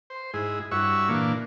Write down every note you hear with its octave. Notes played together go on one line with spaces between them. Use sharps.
C5
G#2 E4 G#4
G2 E4 F#4 C#5 E5 C#6
A#2 E3 A#3 D4